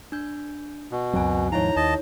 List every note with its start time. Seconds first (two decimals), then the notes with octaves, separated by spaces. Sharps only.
0.12 D4 G6
0.91 B2
1.14 C#2 F#2 F#3 C4 G#5
1.52 D#2 G#2 F3 D#4 E4 C#5 A#5
1.76 D#2 D#5 A5